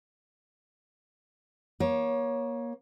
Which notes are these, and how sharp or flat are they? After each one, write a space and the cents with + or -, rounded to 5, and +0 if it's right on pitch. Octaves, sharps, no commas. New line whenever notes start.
A#3 +30 C#5 +0